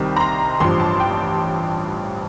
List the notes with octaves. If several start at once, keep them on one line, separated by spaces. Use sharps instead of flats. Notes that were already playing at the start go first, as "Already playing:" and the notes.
Already playing: C2 C3 D#3 G3
A#5
C6
A1 G2 F3 C6
A5
G5